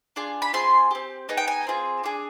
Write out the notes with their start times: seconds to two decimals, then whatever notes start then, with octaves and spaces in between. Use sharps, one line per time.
0.16 D4 F4 G#4
0.42 B5
0.53 C4 F4 G#4 C6
0.91 C4 G4
1.29 B3 D#4 G#4
1.37 G5
1.48 G#5
1.67 C4 F4 G#4
2.04 D4 G#4